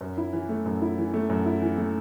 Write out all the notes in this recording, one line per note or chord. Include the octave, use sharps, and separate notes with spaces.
F#2
E4
E3
A3
F#2
E4
E3
A3
F#2
E4
E3
A3